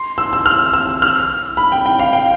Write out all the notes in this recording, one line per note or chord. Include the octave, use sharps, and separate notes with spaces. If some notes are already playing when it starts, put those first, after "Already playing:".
Already playing: C6
E6
E6
F6
E6
F6
B5
G5
G5
F5
G5